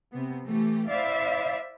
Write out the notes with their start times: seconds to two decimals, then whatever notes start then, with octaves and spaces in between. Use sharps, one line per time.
0.12 C3 B3
0.45 E3 A3 G4
0.88 E4 C5 D5 E5 F5